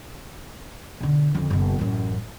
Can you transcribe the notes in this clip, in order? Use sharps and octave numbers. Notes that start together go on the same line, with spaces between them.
B2 D3
F2 D3
F#1 B2
A1 F#2